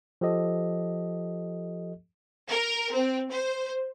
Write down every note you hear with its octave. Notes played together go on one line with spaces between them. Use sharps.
F3 G4 A4 D#5
A#4
C4
C5